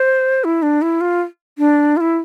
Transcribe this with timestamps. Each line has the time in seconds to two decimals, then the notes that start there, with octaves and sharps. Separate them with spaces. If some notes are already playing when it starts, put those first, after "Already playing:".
Already playing: C5
0.44 E4
0.62 D4
0.82 E4
1.01 F4
1.58 D4
1.97 F4
2.01 E4